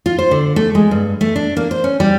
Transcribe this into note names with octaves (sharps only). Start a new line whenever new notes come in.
F4
C5
D3
A3
G#3
G2
A3
D4
A#3
C5
C#4
G3